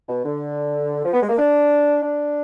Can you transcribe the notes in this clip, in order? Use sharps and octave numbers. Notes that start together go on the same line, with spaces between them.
B2
D3
F3
B3
G#3
A#3
D4
D4